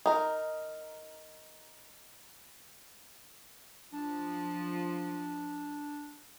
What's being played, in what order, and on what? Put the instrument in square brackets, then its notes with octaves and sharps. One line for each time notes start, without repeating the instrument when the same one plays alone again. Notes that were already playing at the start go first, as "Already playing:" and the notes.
[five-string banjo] D#4 A#4
[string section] F3 [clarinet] D4